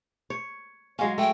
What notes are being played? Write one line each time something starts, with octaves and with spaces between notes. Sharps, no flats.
C#5
F#3 G#3 C#4 F5
A3 G5